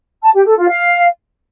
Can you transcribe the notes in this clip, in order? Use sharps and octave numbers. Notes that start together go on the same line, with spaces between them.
A5
G4
A4
F4
F5